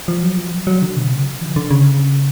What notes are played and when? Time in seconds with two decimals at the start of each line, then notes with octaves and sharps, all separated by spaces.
0.08 F3
0.23 F#3
0.37 F3
0.52 F#3
0.67 F#3
0.82 D3
0.96 B2
1.11 C#3
1.26 D3
1.41 F3
1.56 D3
1.71 C#3